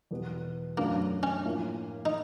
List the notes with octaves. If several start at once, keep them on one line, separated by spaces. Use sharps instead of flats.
E2 B2 G3 B3
F#2 D3 F#3 A3 A#3 D4
C#4
A2 F3 A#3
D#4